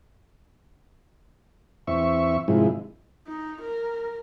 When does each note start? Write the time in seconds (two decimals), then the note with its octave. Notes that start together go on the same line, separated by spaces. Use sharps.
1.87 E2 C4 E5 C#6
2.48 G#2 C3 D#3 F3 G#3 E4
3.27 D#4
3.62 A#4